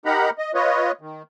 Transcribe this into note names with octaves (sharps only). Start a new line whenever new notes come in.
D#4 G4 A#4 F#5 A#5 B5
D#5
F4 B4 C#5 D#5
D#3